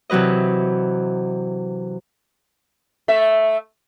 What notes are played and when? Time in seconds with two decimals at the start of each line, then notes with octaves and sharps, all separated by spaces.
0.10 C3 E3 F#3 B4 D#5
3.08 A3 E5